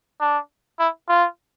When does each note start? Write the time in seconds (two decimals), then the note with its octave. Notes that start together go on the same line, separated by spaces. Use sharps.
0.21 D4
0.79 E4
1.09 F4